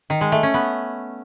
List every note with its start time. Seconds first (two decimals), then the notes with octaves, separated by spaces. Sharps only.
0.10 D#3
0.21 G#3
0.32 A3
0.43 C#4
0.54 B3